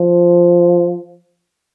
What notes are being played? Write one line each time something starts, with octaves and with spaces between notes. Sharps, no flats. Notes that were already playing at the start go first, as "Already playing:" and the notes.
Already playing: F3